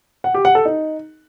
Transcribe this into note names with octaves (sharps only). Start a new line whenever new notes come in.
F#5
G4
F#5
A4
D#4